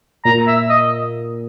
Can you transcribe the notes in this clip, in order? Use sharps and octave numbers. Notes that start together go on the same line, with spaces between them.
A#2 A#5
E5
D#5